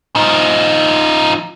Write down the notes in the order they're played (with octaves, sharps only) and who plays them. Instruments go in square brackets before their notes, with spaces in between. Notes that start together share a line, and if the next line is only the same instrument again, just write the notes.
[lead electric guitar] F3 D#4